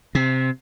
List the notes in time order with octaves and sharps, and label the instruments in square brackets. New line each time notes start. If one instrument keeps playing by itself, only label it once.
[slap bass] C3